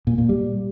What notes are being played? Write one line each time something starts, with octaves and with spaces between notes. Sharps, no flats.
A#2
A#2
G3